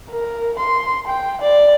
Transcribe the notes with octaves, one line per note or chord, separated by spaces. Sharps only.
A#4
C6
G5
D5